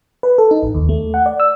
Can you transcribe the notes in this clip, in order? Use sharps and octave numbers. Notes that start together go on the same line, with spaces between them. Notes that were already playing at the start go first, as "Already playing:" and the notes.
B4
A4
D#4
A1
D#2
A3
F#5
D5
E6